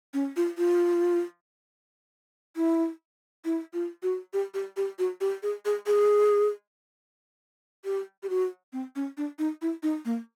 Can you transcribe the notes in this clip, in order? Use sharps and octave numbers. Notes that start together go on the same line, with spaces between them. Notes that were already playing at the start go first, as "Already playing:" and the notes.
C#4
F4
F4
E4
E4
F4
F#4
G4
G4
G4
F#4
G4
G#4
G#4
G#4
G4
G4
F#4
C4
C#4
D4
D#4
E4
D#4
A#3